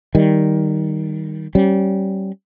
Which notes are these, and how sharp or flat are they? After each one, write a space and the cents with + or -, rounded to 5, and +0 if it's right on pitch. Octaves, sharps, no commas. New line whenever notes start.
D#3 +5 G3 +0
G3 -25 C#4 -30